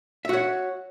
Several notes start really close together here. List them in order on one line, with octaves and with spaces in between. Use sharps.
E5 F#4 C#5